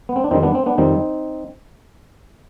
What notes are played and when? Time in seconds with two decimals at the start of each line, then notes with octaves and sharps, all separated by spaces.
0.09 B3
0.16 C4
0.24 D4
0.31 F2 D#3 G3 C4 D#4
0.43 B3 D4
0.55 C4
0.66 B3 D4
0.78 F2 D#3 G3 C4 D#4